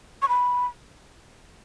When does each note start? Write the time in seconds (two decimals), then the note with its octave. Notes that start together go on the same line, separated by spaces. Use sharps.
0.22 C#6
0.29 B5